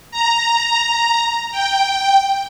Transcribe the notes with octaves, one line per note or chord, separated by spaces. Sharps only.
A#5
G5